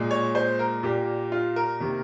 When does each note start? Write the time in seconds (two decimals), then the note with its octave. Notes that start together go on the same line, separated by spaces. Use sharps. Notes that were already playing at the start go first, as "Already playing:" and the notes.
Already playing: A#2 G#3
0.11 C#5
0.35 C5
0.59 A#4
0.83 A#2 G3 A#3 G4
1.32 F4
1.56 A#4
1.80 C3 D#3 A#3